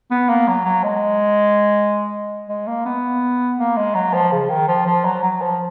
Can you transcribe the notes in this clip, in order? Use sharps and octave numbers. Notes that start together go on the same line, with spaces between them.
B3
A#3
F#3
F#3
G#3
G#3
A#3
B3
A#3
G#3
F#3
F3
C#3
D#3
F3
F3
F#3
F#3
F3